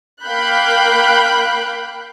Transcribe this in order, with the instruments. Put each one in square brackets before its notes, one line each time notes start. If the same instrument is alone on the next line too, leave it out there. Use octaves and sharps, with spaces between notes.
[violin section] A#3 F5 G5 B5 F#6 G6